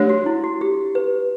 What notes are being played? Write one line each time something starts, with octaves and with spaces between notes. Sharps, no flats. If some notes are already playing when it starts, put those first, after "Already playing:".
Already playing: A3 D4 G4 C#5
F#4
E4
F#4
G4
B4